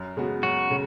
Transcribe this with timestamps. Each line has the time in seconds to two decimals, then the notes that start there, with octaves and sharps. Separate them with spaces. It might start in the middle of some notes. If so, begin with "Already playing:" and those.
Already playing: F#2
0.17 C#3 G#3 B3 F#4
0.43 F#2 F#4
0.71 C#3 G#3